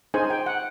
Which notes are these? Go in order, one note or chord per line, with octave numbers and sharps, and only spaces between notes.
D#4 G#4 C5 G#5
G5
F#5